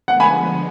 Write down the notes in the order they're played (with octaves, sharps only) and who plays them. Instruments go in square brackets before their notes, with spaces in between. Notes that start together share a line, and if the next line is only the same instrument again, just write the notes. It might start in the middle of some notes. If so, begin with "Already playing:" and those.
[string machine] D3 F3 G#3 B3 [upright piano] F#5
[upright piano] G#5 B5